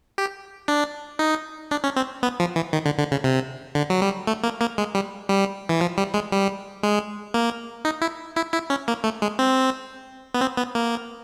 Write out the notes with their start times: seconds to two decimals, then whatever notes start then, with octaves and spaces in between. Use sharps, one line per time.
0.18 G4
0.68 D4
1.19 D#4
1.71 D4
1.84 C#4
1.96 C4
2.23 B3
2.40 F3
2.56 E3
2.73 D#3
2.85 D3
2.99 D3
3.11 C#3
3.24 C3
3.75 D3
3.90 F#3
4.02 G3
4.27 A3
4.43 A#3
4.61 A#3
4.78 G#3
4.95 G3
5.29 G3
5.69 E3
5.81 F3
5.98 G3
6.14 G#3
6.32 G3
6.83 G#3
7.34 A#3
7.85 D#4
8.01 E4
8.36 E4
8.53 E4
8.70 C#4
8.88 A#3
9.04 A3
9.22 G#3
9.39 C4
10.34 B3
10.41 C4
10.57 B3
10.75 A#3